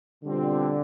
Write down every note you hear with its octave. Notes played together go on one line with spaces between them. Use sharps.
B2 D3 G3 C4 F4